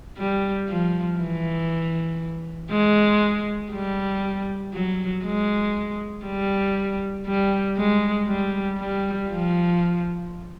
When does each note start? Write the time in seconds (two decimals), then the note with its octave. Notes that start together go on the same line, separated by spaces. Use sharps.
0.18 G3
0.69 F3
1.20 E3
2.71 G#3
3.72 G3
4.74 F#3
5.25 G#3
6.26 G3
7.27 G3
7.78 G#3
8.27 G3
8.78 G3
9.30 F3